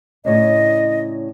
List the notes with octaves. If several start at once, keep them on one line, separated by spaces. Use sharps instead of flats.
A2 C#3 D4 D#5